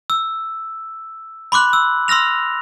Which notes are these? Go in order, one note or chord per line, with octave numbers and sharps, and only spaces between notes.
E6
B5 C6 D6 F#6 F#7
E6
C6 E6 F6 A#6 F7